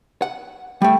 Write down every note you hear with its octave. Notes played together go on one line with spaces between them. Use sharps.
F#5
G3 A3 G5